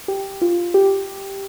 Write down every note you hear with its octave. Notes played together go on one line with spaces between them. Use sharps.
G4
F4
G4